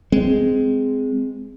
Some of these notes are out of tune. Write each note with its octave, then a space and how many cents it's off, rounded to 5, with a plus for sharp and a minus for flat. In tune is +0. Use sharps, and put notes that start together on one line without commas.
G#3 +0 C4 -20